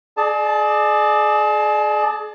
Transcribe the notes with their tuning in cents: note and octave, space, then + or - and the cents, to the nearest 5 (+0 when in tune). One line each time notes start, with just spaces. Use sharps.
G#4 +35 D5 +35 A5 +0